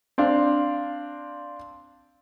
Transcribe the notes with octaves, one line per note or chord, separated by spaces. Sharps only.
C4 D4 F5